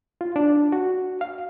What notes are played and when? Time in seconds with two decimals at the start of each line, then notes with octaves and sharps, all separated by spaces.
0.21 F4
0.36 D4
0.72 F#4
1.21 F5